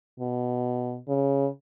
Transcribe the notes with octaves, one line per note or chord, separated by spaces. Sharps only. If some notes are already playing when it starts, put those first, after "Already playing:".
B2
C#3